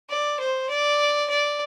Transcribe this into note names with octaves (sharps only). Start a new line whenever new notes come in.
D5
C5
D5
D5